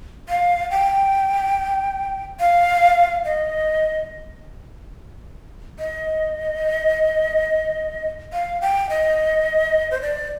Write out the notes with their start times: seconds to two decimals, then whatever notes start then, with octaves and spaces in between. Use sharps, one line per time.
0.29 F5
0.71 G5
2.40 F5
3.25 D#5
5.79 D#5
8.33 F5
8.61 G5
8.90 D#5
9.91 C5
10.01 D5